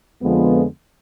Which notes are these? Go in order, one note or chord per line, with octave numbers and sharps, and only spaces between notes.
F2 D3 F3 G#3 B3